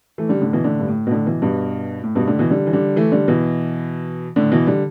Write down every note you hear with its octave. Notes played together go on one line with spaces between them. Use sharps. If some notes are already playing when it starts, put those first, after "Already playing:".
E3 A3
D3 G3
A2 D3
B2 E3
A2 D3
G2
A2
B2
A2 D3
B2 E3
G2 B2
A2
G2 B2
A2 D3
B2 E3
D3 G3
E3
D3 G3
E3 A3
D3 G3
B2 E3
A2 D3
B2 E3
D3 G3